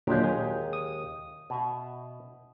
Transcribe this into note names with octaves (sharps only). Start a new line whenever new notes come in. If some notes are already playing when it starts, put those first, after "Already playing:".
D#2 A#2 D3 F#3 G#3 G4
G#4
D#6
B2 E5